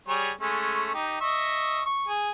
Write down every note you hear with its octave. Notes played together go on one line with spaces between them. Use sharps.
G3 G#4 C#5
G#3 A3 C#4
D#4 G4
D#5 E5 C#6
C#6
G#4